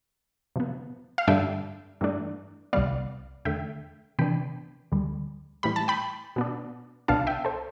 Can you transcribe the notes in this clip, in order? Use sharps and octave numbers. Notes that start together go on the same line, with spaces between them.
C3 F3 B3
F5
G2 D3 G3 D4 E5 G5
G2 E3 A3 D4
C2 C3 G3 B3 D5 F5
E2 D3 A3 E5 G5
C3 E3 B3 D4 G5 B5
D2 D3 G3
A2 E3 G3 B5
A5
G5 B5
B2 B3 D4
C2 B2 B3 D4 F5 A5
E5 G5
A4 C5